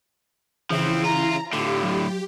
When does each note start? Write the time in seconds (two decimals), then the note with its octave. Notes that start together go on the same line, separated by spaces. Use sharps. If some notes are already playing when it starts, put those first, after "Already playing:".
0.70 C#3 E3 F3 C4 E4
1.04 F4 A#5
1.53 A2 D3 F4 G4
1.83 F#3